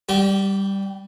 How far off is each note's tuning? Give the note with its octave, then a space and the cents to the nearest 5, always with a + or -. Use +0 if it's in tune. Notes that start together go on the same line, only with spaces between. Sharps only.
G3 +0 G4 -40